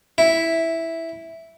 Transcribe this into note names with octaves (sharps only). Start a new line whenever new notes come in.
E4